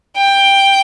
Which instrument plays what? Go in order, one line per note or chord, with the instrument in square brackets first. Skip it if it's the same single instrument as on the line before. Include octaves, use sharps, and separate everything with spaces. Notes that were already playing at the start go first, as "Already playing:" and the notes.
[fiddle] G5